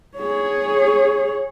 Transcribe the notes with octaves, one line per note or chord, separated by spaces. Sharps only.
G#4 C#5